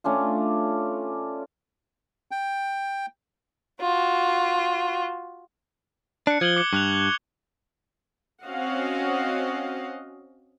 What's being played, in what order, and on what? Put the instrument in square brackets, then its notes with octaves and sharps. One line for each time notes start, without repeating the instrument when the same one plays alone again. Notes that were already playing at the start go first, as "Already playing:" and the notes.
[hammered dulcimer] A3 C#4 D4 F4
[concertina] G5
[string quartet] F4 F#4
[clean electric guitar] D4 [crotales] F#6 C#7
[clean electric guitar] F3 [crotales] G#6 F#7 G7
[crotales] D6 C#7
[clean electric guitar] G2 [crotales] C#6 F#6 F7
[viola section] C4 C#4 F#4 D#5 F5 F#5